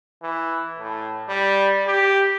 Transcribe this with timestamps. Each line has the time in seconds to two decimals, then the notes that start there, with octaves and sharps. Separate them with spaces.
0.22 E3
0.79 A2
1.29 G3
1.87 G4